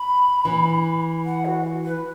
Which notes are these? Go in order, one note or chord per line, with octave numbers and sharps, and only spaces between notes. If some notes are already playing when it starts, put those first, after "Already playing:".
Already playing: B5
E3
F#5
F#4
B4